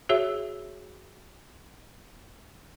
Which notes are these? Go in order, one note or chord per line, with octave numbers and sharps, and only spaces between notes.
F#4 G#4 C#5 E5